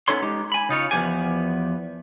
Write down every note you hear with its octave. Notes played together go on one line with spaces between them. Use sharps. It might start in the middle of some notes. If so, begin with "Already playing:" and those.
B3 C#4 D#4 A4 C#5 C6
G#3 D#4 G4
G#5 B5
C#3 D#4 F4 C#5
E2 G#2 F3 B3 G4 G#5